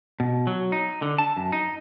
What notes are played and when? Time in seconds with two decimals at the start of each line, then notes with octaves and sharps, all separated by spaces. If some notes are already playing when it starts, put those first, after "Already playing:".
0.20 B2
0.47 F#3
0.72 D#4
1.02 D3
1.18 A5
1.37 F#2
1.52 D#4